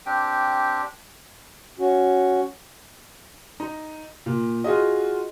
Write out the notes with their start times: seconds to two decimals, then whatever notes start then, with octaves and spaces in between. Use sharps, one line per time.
0.06 C4 D4 G4 G5
1.79 C#4 F#4
3.60 D#4
4.26 A#2
4.64 F4 F#4 G#4 D#5